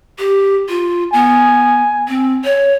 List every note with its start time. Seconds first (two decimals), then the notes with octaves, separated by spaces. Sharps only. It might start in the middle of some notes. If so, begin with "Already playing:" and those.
0.19 G4
0.69 F4
1.13 B3 G#5
2.08 C4
2.44 C#5